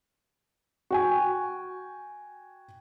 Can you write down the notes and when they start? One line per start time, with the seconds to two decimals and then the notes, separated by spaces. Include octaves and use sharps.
0.90 F#4 G5 G#5